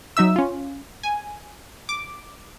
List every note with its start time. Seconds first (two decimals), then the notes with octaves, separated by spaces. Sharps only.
0.17 F#3 D#4 E5 E6
0.36 C#4 F4
1.03 G#5
1.89 D6